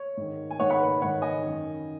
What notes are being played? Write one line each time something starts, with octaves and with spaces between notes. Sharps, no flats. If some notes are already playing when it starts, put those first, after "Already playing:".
Already playing: C#5
G#2 D#3
G#5
G#2 D#3 C#5 F#5
F#5 B5
B4
G#2 D#3 C#5 F#5
D#5 G#5
F#2 D#3